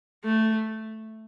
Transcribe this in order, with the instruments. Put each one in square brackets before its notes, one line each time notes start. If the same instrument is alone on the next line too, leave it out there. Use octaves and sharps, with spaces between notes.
[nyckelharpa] A3